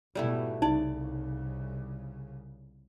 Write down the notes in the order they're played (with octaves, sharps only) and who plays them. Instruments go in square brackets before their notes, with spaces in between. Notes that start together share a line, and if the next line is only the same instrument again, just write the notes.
[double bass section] G#2 B2 [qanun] G3 A3 E4
[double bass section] C2 C#3 [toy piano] D#4 [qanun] D5